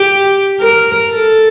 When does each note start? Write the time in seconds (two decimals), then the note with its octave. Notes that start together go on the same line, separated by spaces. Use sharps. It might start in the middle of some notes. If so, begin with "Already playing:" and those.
Already playing: G4
0.61 A#4
1.12 A4